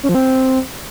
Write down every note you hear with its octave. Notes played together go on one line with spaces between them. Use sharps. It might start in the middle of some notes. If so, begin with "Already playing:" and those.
C#4
F3
C4